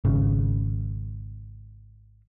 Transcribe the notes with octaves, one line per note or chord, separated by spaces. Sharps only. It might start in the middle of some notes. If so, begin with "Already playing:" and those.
G#1 C#3